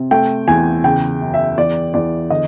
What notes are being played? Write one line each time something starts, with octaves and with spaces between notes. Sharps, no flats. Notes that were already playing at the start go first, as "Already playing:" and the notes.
Already playing: C3
A3 G5
E2 G#5
C#3 G5
F#2
E5
E2 D5
E2 D5
D3 D#5